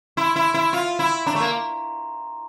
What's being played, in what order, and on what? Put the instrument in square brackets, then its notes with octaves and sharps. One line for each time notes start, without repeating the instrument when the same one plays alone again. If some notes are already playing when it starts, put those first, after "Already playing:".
[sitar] E4 [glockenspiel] C6
[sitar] E4
E4
F4
E4
[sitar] D4 [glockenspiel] A#5
[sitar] A3
A#3